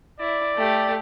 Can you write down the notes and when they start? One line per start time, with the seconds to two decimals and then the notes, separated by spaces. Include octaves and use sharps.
0.20 E4 D5
0.56 A3 G4